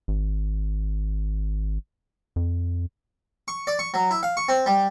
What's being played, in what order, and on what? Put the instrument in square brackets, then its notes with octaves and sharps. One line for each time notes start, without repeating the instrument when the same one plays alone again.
[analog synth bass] G#1
F2
[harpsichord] C#6
D5
C#6
F#3
E4
F5
C#6
C4
G3